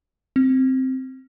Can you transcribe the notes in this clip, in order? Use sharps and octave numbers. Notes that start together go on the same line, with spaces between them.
C4